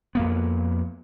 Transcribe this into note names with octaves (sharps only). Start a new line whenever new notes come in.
F2 A#3 B3